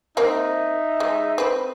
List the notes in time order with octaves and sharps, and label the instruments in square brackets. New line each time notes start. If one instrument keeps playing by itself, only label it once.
[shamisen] A#3 C4 A#4 [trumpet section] D#4 E5
[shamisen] G#3
C4 B4